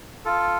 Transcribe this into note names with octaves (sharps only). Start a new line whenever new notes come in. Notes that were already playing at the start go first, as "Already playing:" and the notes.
F4 A4